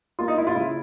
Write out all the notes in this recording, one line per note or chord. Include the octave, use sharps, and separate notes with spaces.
A#3 F4
D#4
A#3 E4
F4
C#3 E4